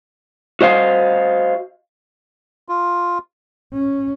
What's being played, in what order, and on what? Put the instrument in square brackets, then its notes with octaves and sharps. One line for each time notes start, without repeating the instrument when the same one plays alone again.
[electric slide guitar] F#4 C5 D#5 F5
[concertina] F4
[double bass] C#4